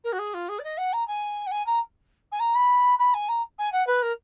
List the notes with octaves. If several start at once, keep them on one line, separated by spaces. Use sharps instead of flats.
A#4
F#4
G#4
F4
G#4
D5
D#5
F#5
A#5
G#5
F#5
G#5
A#5
G#5
A#5
B5
B5
G#5
A#5
G#5
F#5
B4
A#4